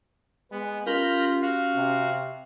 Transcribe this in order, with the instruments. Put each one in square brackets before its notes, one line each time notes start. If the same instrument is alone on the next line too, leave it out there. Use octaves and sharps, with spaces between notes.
[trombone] G#3 [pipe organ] B3
[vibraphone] C#4 G4 [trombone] F4 [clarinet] A#4 [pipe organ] A#5 B5 G6
[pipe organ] F#4 [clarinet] F5
[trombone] C3